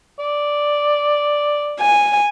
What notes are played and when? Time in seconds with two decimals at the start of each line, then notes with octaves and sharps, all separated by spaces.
0.19 D5
1.80 G#5